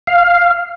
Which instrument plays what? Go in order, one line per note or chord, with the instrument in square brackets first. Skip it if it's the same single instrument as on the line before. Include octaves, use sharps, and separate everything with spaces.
[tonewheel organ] F5